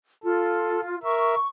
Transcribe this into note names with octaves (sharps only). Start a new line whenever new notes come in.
F4 A4
A#4 E5 C#6